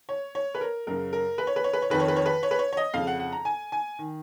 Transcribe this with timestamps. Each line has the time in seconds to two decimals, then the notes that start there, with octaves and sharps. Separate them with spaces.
0.09 C#5
0.35 C#5
0.55 B4
0.61 A#4
0.87 F#2 C#3 A#4
1.13 A#4
1.38 B4
1.47 C#5
1.56 B4
1.64 C#5
1.73 B4
1.82 C#5
1.90 F2 D#3 B4
2.00 C#5
2.08 B4
2.16 C#5
2.26 B4
2.43 C#5
2.51 B4
2.59 C#5
2.73 C#5
2.77 D#5
2.93 F2 C#3 F5
3.07 F#5
3.20 F#5
3.33 A#5
3.45 G#5
3.72 G#5
3.99 D#3